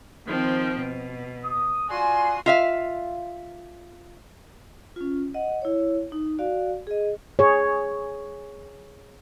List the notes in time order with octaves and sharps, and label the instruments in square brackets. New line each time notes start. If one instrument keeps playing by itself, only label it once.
[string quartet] D#3 F3 C4
B2
[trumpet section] D#6
[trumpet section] F4 D5 G#5 [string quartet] F#4 C6 D#6
[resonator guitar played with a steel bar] F4 E5 F5
[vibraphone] C#4 F4
D#5 F#5
E4 C#5
D#4
F#4 D5 F5
G#4 D#5
[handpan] G#4 C#5